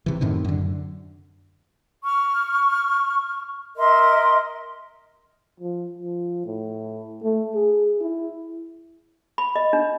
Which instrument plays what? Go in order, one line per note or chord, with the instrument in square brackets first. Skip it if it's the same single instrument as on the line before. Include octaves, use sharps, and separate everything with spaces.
[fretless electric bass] C3 E3
F#2 A2 C3 D#3
F#2 D3
[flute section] C#6 F6
A#4 D#5 E5 C6
[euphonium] F3
F3
A2
A3
G#4
E4
[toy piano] B5
D#5
D4